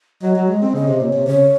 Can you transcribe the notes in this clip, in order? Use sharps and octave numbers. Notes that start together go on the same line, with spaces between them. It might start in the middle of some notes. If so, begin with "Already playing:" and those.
F#3 D#5
F#3
G#3
C4
C#3 D#5
C3
A#2 C#5
C3
C#3 C#5